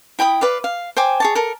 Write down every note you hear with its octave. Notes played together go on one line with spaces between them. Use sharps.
E4 G5 B5 D#6
B4 D5 F5
F5
C5 G5 G#5 D6
G#4 C#5 A5
A4 A#4